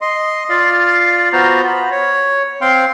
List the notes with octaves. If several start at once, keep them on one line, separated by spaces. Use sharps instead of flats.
D#5 C6
F4 D5 F5
B3 F4 F#4 C5 A#5
B5
C#5
C4 F5 G5 C6